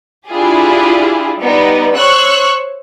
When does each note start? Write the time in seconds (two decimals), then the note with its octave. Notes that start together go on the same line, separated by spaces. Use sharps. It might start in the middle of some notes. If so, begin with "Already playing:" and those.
0.29 D4 E4 F4 G4 G#4
1.40 G3 B3 D#4
1.96 C5 C#5 C#6 E6 F#6